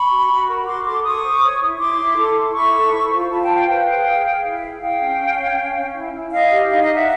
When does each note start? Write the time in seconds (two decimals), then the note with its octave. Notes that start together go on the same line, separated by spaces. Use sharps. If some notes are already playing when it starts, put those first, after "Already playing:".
Already playing: B5 C#6
0.11 F#4
0.29 F#4
0.48 A#4
0.67 F#4 C6 D6
0.86 A4 C6 D6
1.04 A4 C#6 D#6
1.24 C5
1.42 C#5
1.62 E4
1.80 E4 C6 D6
1.99 E4
2.17 A4
2.36 E4
2.55 E4 B5 C#6
2.75 A4
2.93 C5
3.12 F4
3.31 F4 A5 B5
3.43 G5 A5
3.49 C5
3.56 F5 G5
3.68 B4 F5 G5
3.88 G#4
4.06 G#4
4.26 G#4
4.43 E4
4.63 G#4
4.81 G#4 F5 G5
5.01 C#4
5.19 C#4
5.38 C#5
5.57 C#4
5.76 C#4
5.95 E4
6.13 E4
6.32 E4 D#5 F5
6.51 G4
6.70 D#4 D#5 F5
6.82 D#5 F5
6.89 D#4
6.95 E5 F#5